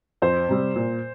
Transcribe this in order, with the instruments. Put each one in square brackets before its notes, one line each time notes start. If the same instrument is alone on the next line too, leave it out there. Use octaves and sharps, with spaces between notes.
[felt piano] F2 [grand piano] C5
[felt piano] C3 G3 C4
A#2